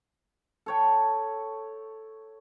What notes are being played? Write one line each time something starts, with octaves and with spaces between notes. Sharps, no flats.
A4 C#5 G5